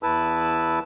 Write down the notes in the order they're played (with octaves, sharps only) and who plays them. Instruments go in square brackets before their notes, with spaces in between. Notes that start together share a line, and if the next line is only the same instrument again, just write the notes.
[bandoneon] E2 E4 B4 A5 E6